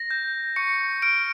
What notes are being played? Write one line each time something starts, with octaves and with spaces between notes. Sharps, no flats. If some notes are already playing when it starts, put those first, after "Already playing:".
Already playing: A#6
G6
C#6 C#7
F6 D7